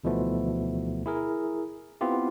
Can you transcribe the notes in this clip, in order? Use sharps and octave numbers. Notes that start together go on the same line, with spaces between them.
D2 B2 E3 F3 A3 B3
E4 G#4 A#4
B3 C4 E4 F4 G4